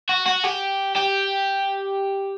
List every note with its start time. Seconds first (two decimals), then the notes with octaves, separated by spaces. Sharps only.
0.09 F#4
0.27 F#4
0.44 G4
0.96 G4